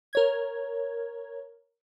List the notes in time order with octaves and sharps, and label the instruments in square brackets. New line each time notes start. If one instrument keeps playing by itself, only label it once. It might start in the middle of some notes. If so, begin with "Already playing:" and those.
[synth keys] A#4 C#5 G#6